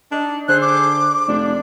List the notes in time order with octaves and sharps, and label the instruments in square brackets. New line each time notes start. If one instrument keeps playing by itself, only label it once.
[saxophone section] D4 D#4
[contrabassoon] D3 [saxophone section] G#4 A4 C5 [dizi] F#6
[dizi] D6
[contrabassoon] F1 [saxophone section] F2 D4